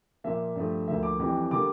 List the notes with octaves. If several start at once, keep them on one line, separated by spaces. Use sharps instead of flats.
A#2 F3 A#3 E5
G2 F3 A3
D2 D3 F3 A#3 E5
D6
F2 E3 G3
D3 G3 A#3 D6